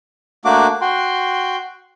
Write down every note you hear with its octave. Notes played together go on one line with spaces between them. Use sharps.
A3 A#3 D4 F#4 D6
F#4 G5 C6